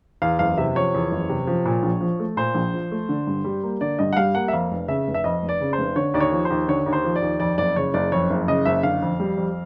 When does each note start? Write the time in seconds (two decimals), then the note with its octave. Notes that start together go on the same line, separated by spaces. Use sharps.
0.22 E2 F5
0.39 F#1 F5
0.58 C3 E5
0.75 F3 C#5
0.94 E2
1.11 F#1
1.29 C3
1.47 F3
1.65 A#2
1.83 A#1
2.01 F3
2.20 A3
2.37 A#2 C5
2.55 A#1
2.74 F3
2.92 A3
3.09 D3
3.27 G2
3.44 G3
3.63 A#3
3.81 D3 D5
3.99 G2 D#5
4.13 F#5
4.17 G3 F5
4.35 A#3 F#5
4.48 E5
4.53 F2 F5
4.71 F1
4.88 C#3 E5
5.07 F1
5.14 E5
5.24 F2 D#5
5.42 F1
5.49 D5
5.61 C#3
5.73 C5
5.78 F1
5.96 D3 C#5
6.14 D#2 D5
6.20 C#5
6.32 F3
6.45 C5
6.50 D#2
6.68 D3 C#5
6.86 D#2
6.93 C5
7.04 F3
7.16 D5
7.22 D#2
7.40 F2 D5
7.58 F#1 D5
7.76 C#3 C#5
7.94 F#1 D5
8.12 F2 C#5
8.30 F#1
8.47 C#3 D#5
8.65 F#1 E5
8.83 D3 F5
9.02 F2
9.20 G3
9.37 F2